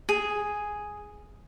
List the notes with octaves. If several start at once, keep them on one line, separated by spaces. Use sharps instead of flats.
G#4